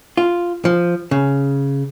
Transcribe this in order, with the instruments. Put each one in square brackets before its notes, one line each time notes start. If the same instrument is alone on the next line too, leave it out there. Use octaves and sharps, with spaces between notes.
[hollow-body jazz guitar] F4
F3
C#3